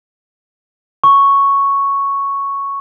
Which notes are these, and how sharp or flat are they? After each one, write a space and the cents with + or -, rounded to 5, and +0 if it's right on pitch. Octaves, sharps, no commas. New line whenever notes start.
C#6 +0